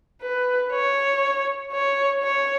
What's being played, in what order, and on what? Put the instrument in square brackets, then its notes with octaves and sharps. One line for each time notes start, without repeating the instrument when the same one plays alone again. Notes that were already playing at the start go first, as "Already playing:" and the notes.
[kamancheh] B4
C#5
C#5
C#5